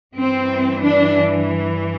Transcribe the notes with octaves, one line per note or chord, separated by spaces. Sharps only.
G2 E3 C4
D4